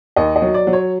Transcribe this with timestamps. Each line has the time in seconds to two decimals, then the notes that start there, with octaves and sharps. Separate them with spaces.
0.16 D#2 D#5
0.36 D#5
0.42 F#3
0.54 D5
0.67 F#3
0.73 C#5